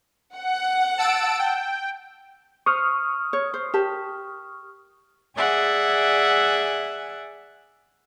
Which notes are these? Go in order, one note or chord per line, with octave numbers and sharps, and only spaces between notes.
F#5
A5 E6 D7
G5
C5 C#6 D#6 F6
C#5
C5
G4 A#4 A5
G#4 D5 E5 F#5 G#5